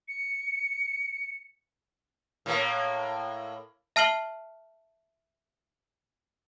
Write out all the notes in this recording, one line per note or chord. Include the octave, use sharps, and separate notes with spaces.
C#7
A2 A#3
E5 A5 F6 C7 F#7 G7